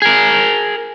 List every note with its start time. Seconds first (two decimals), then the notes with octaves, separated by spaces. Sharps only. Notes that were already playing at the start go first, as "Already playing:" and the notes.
0.02 G#4 A#4